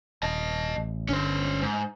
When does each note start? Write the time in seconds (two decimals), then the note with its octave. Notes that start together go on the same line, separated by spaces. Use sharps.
0.23 D#1 D#5 A5
0.76 A1
1.09 G1 D3 C#4 C5
1.62 G#2